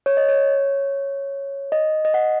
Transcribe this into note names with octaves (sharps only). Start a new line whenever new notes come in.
C#5
D#5
C#5
D#5
D#5
F#5